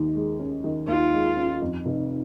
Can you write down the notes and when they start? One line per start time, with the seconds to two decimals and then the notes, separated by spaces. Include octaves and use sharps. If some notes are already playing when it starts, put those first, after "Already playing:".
Already playing: D#2 D#3
0.15 G#3
0.39 C#4
0.64 D#3
0.88 D#2 F4
1.13 G#3
1.37 C#4
1.62 F2
1.86 F1